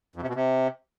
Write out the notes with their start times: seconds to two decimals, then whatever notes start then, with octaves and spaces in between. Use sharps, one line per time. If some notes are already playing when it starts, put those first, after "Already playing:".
0.16 F2
0.22 C3
0.28 B2
0.35 C3